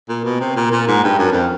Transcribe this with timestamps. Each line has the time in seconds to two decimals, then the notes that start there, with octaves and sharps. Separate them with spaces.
0.09 A#2
0.25 B2
0.40 C3
0.56 A#2
0.72 A#2
0.88 G#2
1.04 G2
1.19 F#2
1.33 F2